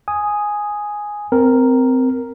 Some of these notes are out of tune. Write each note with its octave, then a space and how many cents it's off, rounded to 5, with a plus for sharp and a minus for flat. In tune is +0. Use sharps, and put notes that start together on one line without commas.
G#5 +0 D#6 +0
C4 -20 A#4 +0